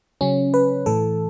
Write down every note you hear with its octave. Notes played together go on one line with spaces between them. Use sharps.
C#3 F#3 C#4
B4
A2 E3 A4